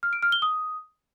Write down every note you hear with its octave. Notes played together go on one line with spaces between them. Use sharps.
F6
D7
F6
G7
D#6